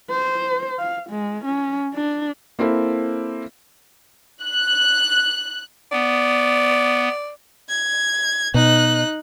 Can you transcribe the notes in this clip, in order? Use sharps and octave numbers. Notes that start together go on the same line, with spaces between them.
C5
F5
G#3
C#4
D4
A#3 C4 E4 A4
F#6
B3 D5
G#6
B2 D#4 F#6